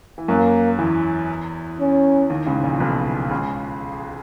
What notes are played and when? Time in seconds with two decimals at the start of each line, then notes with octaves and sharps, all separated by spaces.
0.18 E3
0.28 F#2 F#3 A#3
0.79 E2 E3
1.80 C#4
2.30 D#2 D#3
2.46 C#2 C#3
2.58 G#2
2.63 A#1 A#2
2.80 B1 B2
3.30 C#2 C#3